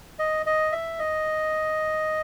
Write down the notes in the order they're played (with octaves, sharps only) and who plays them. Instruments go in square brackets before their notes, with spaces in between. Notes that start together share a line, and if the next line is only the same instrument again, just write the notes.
[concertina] D#5
D#5
E5
D#5